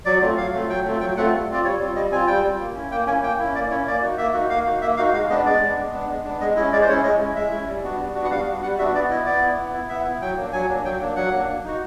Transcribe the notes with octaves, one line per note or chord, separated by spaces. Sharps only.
F#3 D5
A3 C4 F4
F#3 F5
A3 C4 F4
F#3 G5
A3 C4 F4
F#3 G5
A3 C4 F4 F#5
G3
C4 F4 D5
G3 C#5
C4 F4
G3 D#5
C4 F4 G#5
G3 G5
C4 F4
A#3
C#4 E4
A#3 G5
C#4 G#5
E4
A#3 G5
C#4 E4
A#3 D5
C#4 E4 C#5
A#3 D5
D#4 F#4
A#3 E5
D#4 F#4
A#3 F5
D#4 F#4
A#3 E5
D#4 F#4 F5
G#3 F5
B3 D4 D#5
G#3 D5
B3 D4
G#3
B3 D4
G#3
B3 D4
G#3 D#5
C#4 E4 D#5
G#3 D5
C5
C#4 E4 C#5
G#3 D#5
C#4 E4
G#3 E5
C#4 E4
G3
B3 D4 F#4
G3
B3 D4 F#4
F#5
G3 F5
B3 D4 F#4
G3 F#5
B3 D4 F#4 E5
B3 D5
E4 D#5
B3 D5
E4
B3
E4
B3 E5
E4
F#3 G5
A#3 D4
F#3 G#5
A#3 D4
F#3 G5
A#3 D4
F#3 F#5
A#3 D4
A#3
D#4 F#4